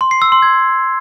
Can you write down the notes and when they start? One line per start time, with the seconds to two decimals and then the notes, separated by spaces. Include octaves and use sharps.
0.01 C6
0.11 C7
0.22 E6
0.32 C6
0.42 G#6